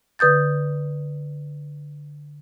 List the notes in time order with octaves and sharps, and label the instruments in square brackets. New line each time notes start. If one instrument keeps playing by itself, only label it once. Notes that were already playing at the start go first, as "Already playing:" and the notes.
[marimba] D3 B4 D#6 G6 A6